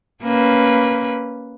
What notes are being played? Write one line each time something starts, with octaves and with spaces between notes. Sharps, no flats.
A#3 C#4 B4